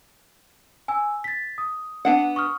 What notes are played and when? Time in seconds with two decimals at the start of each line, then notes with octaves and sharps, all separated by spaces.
0.88 G#5 E6
1.24 A6 B6
1.58 D#6
2.05 B3 D4 F#5
2.36 C#6 D#6 F6